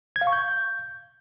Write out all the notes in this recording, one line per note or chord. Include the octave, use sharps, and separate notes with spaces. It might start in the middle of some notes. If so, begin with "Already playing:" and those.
G#6
F5
C#6
G6